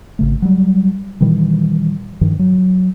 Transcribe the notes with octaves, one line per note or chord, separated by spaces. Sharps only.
G#1 C#3 A3
F#3 G3
A#2 D#3 E3 G3
G2 D#3 F3
F#3